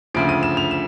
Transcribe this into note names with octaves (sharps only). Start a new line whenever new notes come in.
D2 C#3 F3 D7
D#7
E7
F7
E7